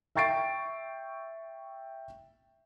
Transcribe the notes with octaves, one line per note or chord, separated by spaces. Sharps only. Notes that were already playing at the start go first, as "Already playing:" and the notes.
E5 G5 C#6 A6 C7 D7